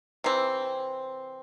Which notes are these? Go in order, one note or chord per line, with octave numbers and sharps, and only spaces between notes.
C3 E3 C4